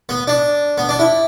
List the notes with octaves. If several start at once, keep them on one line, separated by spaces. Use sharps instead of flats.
B3
D4
B3
D4
E4